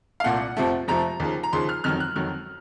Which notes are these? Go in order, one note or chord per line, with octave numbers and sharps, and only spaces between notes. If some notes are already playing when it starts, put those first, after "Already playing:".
F5
C2 A#2 A3 F#5
F2 C3 F3 A3
F2 C3 F3 A3 A#5
D#2 C#3 F3
A#5
D#2 C#3 F3 C6
F6
F2 D#3 F#3 F6
F#6
F2 D#3 F#3 F6